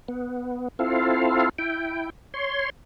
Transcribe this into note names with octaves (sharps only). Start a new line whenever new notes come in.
B3
C4 E4 F4 A4 F5
E4 G5
C#5 C6